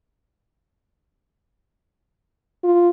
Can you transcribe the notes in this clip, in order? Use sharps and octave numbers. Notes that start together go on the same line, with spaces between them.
F4